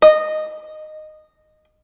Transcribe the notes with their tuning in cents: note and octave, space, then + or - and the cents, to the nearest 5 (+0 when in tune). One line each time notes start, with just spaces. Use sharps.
D#5 -15